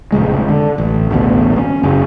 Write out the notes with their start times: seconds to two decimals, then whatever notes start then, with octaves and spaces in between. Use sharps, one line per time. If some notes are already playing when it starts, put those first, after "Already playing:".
0.12 F1 A#1 C#3 G#3
0.49 D3
0.78 A1
1.10 A1 D2 B2
1.56 A#3 C#4
1.83 F#1 C#3